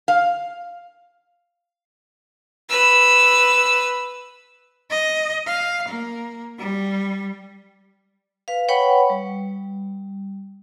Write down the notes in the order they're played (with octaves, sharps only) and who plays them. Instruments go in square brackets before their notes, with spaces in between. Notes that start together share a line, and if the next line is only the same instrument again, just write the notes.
[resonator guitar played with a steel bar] F5
[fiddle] B4 E6
[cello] D#5
F5
A#3
G3
[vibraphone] B4 F5
B4 C#5 F#5 G5 B5 C#6
G3